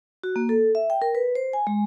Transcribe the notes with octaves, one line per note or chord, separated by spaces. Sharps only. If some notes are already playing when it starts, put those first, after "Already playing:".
F#4
A#3
A4
E5
G5
A#4
B4
C5
G#5
G#3